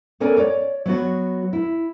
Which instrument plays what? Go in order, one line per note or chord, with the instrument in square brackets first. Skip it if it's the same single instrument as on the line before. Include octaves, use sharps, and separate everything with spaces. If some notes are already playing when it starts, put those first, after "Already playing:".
[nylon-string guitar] B3 C#4 A4 A#4 D5 G#5
C#5 D5
F#3 B3 F#4
E4